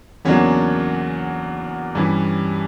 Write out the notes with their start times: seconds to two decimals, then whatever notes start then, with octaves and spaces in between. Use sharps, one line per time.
0.25 E2 C#3 F#3 A#3 C#4 D4 C#5
1.95 G2 E3 G3 C#4